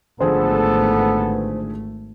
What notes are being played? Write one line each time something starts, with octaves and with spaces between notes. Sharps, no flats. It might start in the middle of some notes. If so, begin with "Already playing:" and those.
G#1 D3 F3 A3 B3 G#4 A4 C5